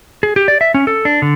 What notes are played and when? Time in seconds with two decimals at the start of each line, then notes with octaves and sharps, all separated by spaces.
0.23 G#4
0.36 G4
0.48 D5
0.61 E5
0.74 C#4
0.87 A4
1.05 D4
1.22 D3